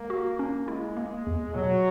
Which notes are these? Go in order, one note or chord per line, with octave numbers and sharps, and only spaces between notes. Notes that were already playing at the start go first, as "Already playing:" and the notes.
Already playing: G#3 A#3
F#4
C#4
G#3 E4
A#3
E2
B2 F#3